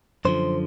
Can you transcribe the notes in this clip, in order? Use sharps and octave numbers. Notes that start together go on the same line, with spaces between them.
F#2 D3 F3 C5